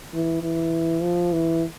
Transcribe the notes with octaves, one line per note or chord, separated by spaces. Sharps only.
E3
E3
F3
E3